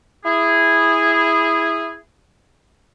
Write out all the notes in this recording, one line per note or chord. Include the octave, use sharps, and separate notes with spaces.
E4 G#4